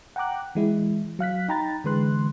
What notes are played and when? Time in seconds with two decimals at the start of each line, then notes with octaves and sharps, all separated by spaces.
0.16 F#5 G5 A#5 D6 F#6
0.55 E3 G#3 E4
1.19 F#3 F5 F#6 B6
1.49 D#4 G5 A#5 B5 A6
1.84 D3 E3 G#3 B4 C6 F#6